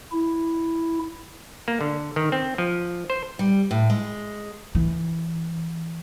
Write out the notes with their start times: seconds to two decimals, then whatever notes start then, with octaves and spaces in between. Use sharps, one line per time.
0.12 E4
1.68 A#3
1.81 D3
2.16 D#3
2.32 C4
2.58 F3
3.10 C5
3.39 G3
3.71 A2
3.90 G#3
4.75 E3